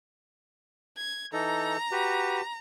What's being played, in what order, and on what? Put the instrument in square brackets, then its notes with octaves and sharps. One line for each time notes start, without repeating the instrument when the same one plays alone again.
[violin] G#6
[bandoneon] E3 D#4 A4 [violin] A#5
[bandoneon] F#4 G4 B4